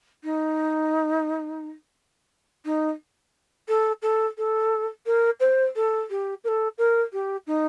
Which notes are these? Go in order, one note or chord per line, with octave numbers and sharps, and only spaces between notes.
D#4
D#4
A4
A4
A4
A#4
C5
A4
G4
A#4
A4
A#4
G4
D#4